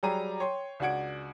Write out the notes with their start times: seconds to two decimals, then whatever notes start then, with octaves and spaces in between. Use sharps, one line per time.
0.03 F#3 G3 G4 G#4 A#5 D#7
0.40 C#5 G5 C6
0.80 C#2 D4 F#4 F#5 G#6 D7